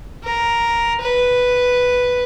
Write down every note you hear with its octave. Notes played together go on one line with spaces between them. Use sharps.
A#4
B4